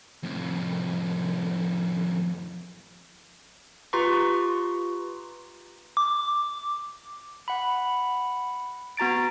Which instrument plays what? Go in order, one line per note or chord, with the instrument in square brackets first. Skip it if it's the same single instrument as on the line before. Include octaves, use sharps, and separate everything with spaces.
[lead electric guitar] F2 A2
[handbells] F4 G4 B4 A#5 C6 C#6
[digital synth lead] D6
[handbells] F#5 B5
B3 F#4 A#5 A6 D7